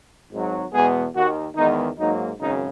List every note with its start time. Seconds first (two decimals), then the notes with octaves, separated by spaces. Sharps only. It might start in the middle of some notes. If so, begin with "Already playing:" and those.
0.31 G#1 G#2 F#3
0.72 E2 B2 G#3 B3 G#4
1.14 D#2 D#3 A#3 F#4
1.56 E2 D#3 G#3 B3 D#4
1.98 G#2 F#3 A#3 D#4
2.39 G#1 F#2 C#3 D#4